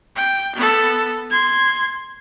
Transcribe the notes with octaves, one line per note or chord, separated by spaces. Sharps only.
G5
B3 A4
C6 G#6